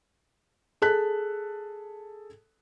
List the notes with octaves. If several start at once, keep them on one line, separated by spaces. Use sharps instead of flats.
G#4 A4 A5 F#6 B6